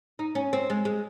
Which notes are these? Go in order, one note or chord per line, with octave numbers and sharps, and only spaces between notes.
D#4
C#4
C4
G#3
G#3